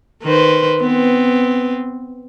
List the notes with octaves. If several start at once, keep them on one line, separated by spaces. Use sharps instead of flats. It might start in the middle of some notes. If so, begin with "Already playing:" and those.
D#3 B4 C5
B3 C4